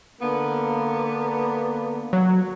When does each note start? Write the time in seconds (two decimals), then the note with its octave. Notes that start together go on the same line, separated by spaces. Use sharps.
0.22 D3 A#3 B3
2.13 F#3